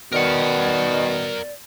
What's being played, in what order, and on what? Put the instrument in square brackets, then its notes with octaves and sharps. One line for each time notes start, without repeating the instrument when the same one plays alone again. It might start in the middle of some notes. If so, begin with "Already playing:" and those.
[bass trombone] B2 [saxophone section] D#3 [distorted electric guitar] A#4 F#5 [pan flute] D5